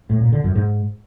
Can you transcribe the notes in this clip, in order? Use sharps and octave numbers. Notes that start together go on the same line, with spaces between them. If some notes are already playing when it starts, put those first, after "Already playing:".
A2
A#2
D3
F#2
G#2